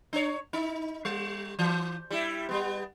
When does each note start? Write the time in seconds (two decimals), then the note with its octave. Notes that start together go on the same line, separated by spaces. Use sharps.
0.13 D4 C#5
0.53 D#4
1.05 G3
1.59 E3
2.11 G3 E4
2.49 G3 B3